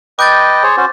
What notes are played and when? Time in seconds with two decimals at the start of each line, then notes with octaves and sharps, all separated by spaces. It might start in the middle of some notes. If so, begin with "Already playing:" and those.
0.19 B4 D#5 G5 D6 G6 A6
0.63 G#4 C5 C#5
0.77 C#4 F#4 C5